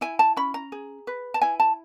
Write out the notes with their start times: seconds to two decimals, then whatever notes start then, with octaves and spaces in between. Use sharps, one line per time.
0.01 E4 G#5
0.19 A5
0.37 C#4 B5
0.54 A#5
0.72 G#4
1.07 B4
1.34 A5
1.42 E4 G#5
1.60 A5